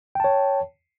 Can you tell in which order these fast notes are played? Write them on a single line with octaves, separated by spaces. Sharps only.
G5 A5 C#5